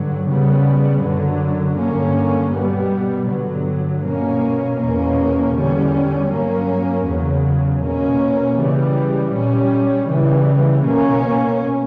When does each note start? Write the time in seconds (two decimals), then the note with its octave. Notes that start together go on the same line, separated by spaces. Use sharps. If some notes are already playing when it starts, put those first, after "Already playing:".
Already playing: G2 D3 F#3
0.26 C#3 G3 B3
1.02 F#2 D3 F#3
1.77 G2 D3 A#3 C#4
2.52 B2 G3 B3
3.28 G2 D3 F#3
4.03 B2 A#3 C#4
4.79 E2 B2 A#3 C#4
5.54 E2 D3 G3 C#4
6.30 G2 F#3 A#3 C#4
7.05 E2 C#3 F#3
7.81 B2 A#3 C#4
8.56 C#3 E3 G3
9.32 A#2 G3 C#4
10.07 C#3 E3 G3
10.83 B2 A#3 C#4